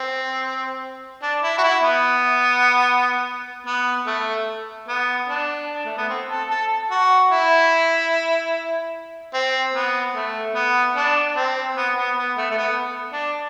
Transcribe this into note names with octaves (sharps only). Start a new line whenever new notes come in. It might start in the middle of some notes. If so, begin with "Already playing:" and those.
Already playing: C4
D4
E4
F#4
E4
B3
B3
A3
B3
D4
A3
B3
C4
A4
A4
F#4
E4
C4
B3
A3
B3
D4
C4
B3
B3
B3
A3
A3
B3
D4